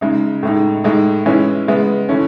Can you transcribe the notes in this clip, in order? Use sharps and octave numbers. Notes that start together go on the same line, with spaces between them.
C#3 G#3 D#4
A2 G#3 D#4
A2 G#3 D#4
E3 G#3 C#4 E4
C#3 G#3 B3
E3 A3 C#4